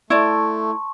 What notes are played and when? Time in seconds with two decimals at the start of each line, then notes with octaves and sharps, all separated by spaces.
0.10 A3 E4 D5 A5 C6 C#6